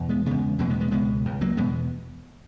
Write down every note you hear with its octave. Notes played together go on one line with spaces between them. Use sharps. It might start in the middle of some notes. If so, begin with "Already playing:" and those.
Already playing: E2 B2
G#3 B3
E2 C#3 G#3 B3
E2 B2 F#3 A#3
G#3 B3
G#3 B3
C#2 B2 G#3 B3
C#2 C#3
F#3 A#3
E2 B2 G#3 B3